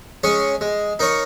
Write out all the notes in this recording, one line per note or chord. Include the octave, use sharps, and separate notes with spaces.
G#3 C#4 G#4 C#5
G#3
D#4 A#4 C#5